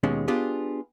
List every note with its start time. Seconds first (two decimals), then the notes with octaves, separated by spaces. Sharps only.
0.03 D#2 B2 G#3 C#4
0.28 B3 D4 F4 G4 G#4